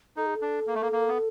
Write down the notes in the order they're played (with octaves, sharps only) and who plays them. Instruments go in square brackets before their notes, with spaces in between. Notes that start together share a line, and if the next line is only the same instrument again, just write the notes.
[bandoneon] D#4 [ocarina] A4
[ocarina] G#4
A4
[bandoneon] D4
A#3
A3
A#3
A#3
B3